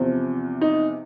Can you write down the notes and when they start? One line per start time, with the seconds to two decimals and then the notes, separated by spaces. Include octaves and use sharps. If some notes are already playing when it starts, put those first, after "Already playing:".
Already playing: E2 C3 F3
0.61 D#4